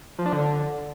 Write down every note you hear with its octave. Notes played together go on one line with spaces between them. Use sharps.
F3
D4
D3